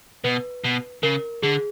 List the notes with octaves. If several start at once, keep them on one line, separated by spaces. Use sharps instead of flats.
B2 B4
B2
C#3 A#4
D3 G#4